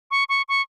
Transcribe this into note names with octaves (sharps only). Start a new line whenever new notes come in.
C#6
C#6
C#6